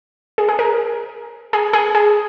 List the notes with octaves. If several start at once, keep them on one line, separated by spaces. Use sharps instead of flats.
G#4
G#4
A#4
G#4
G#4
G#4